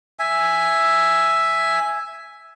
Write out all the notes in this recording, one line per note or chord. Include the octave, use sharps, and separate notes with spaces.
E5 G#5